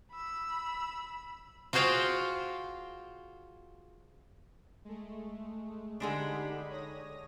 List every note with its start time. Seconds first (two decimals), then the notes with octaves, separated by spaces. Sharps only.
0.12 B5 E6
1.73 F4 F#4 G#4 C5 F5 G5
4.85 G#3 A3
6.00 D3 G#3 D4 D#4 G4 B5
6.70 C#5 D#6 A#6